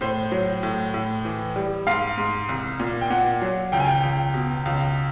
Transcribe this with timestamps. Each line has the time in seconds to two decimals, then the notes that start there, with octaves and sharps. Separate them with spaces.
0.01 A2 C5
0.32 F#3
0.63 A2
0.94 A2
1.25 E3
1.56 G3
1.87 G#2 F5
2.18 G#2
2.49 C2
2.80 A#2
3.01 G5
3.10 A#2 F#5
3.42 F#3
3.72 C#2 G5
3.80 G#5
3.88 G5
4.03 C#2
4.34 B2
4.65 C#2